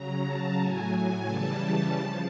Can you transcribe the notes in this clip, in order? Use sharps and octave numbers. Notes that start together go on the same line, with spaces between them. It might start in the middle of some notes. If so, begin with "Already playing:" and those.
Already playing: C#3 F#3 A#5
A5
A2 F#3 G#5
G#5
C#3 E3 G3 A5
C#3 F3